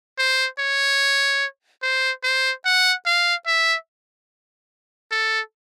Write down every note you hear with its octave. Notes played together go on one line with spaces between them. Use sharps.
C5
C#5
C5
C5
F#5
F5
E5
A4